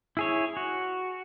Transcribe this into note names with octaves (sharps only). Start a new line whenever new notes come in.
E4 G#4 C#5
F#4